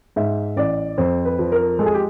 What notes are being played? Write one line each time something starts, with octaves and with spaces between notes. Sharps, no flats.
G#2 E5
A1 D5
F2 C5
B4
F3
A#4
G#3 A4
G#4
G4